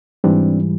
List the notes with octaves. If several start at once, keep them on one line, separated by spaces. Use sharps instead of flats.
G#2 E3 G3 C4 D4